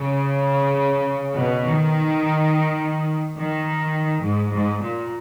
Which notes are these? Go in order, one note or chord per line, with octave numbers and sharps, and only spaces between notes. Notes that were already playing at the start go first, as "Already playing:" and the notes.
Already playing: C#3
B2
D#3
D#3
G#2
G#2
A#2